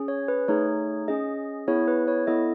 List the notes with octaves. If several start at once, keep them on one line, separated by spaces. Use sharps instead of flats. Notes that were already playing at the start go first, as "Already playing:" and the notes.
Already playing: C#4 G#4
C#5
B4
A3 D#4 G#4 C#5
C#4 G#4 D#5
B3 E4 G#4 C#5
B4
C#5
B3 E4 A4 D#5